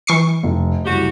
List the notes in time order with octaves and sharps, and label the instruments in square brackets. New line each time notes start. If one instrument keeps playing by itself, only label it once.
[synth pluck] E3 C#6 C7
[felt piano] F1
[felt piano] F#1 C2 [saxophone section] F#4 G4